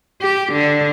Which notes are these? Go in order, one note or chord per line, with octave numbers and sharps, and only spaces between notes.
G4
D3